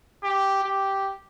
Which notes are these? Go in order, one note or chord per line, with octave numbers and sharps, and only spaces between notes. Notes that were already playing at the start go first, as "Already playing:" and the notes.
G4
G4